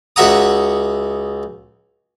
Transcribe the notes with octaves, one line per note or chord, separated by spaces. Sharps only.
C#2 F#4 E5 F#5 A#5 D#6